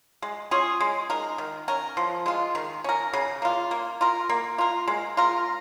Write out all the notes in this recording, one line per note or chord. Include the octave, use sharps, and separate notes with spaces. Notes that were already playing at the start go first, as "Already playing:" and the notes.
G#3
C#4 F4 G#4
G#3
D#4 A#4
D#3
C#4 A#4
F3
G#3 F4
D#3
C#4 A#4
C#3
A#3 F4
A#3
F4 A#4
A#3
F4 A#4
G#3
F4 A#4